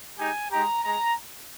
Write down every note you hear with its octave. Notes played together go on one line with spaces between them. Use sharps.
G#3 D#4 G4 G#5
G#3 D#4 G4 A#5
G#3 A#5